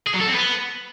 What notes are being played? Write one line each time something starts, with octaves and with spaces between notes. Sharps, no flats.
G#4
F#3
A4
C4
B3